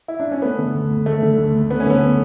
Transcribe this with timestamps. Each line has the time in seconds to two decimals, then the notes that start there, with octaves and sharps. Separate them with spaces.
0.08 E4
0.20 D4
0.31 C#4
0.42 A3 B3
0.58 D3
0.74 D2
0.90 D2
1.06 A3
1.22 D3
1.38 D2
1.54 D2
1.70 A3 B3
1.80 C#4
1.86 D3 B3